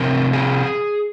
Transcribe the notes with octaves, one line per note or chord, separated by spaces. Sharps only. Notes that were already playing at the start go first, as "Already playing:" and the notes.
Already playing: C3 F3 C4 A#4
G#4